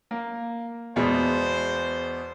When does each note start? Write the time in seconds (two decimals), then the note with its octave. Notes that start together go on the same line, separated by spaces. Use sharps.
0.11 A#3
0.96 E2 B2 G#3 C5